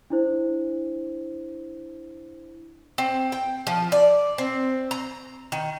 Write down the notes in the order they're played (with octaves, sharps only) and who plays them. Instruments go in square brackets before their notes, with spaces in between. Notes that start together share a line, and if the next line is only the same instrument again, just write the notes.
[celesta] D4 E4 C5
[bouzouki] C4
G5
F3
D5
C4
A#5
D#3